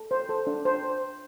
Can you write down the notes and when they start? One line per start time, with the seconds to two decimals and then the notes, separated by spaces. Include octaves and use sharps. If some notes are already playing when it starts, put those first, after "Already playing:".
Already playing: A4
0.11 C5
0.29 A4
0.47 D4
0.65 C5